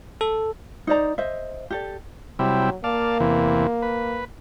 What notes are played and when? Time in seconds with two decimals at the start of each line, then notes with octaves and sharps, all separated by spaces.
0.21 A4
0.87 D#4 C5 D5 A#5
1.18 C5 D#5 E5
1.70 G4 A4 D5
2.39 C3 F#3 G3 E4
2.84 A#3 D5 F5 A5
3.20 E2 C3 E3
3.82 B4